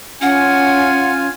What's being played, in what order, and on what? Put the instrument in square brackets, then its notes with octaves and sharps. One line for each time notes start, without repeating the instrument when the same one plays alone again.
[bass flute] C#4 [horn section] F4 [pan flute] F#5 [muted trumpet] G#5